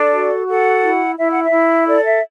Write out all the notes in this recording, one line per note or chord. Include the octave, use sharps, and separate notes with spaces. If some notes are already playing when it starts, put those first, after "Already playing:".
Already playing: D4 A4 D5
F#4
A4 F#5
E4
E4 E5
F#5
E5
E4
A4 D5
E5